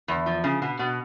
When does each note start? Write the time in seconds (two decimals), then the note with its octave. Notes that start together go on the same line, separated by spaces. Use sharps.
0.08 E2
0.26 F3
0.44 C#3
0.62 B2
0.79 B2